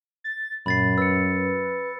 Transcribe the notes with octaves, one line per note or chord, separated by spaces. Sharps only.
A6
F#2 A#2 B5 A6 C7
B4 E6 C#7